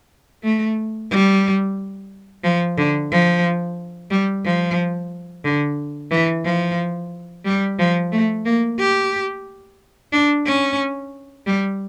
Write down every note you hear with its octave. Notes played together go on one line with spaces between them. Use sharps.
A3
G3
F3
D3
F3
G3
F3
D3
E3
F3
G3
F3
A3
A#3
G4
D4
C#4
G3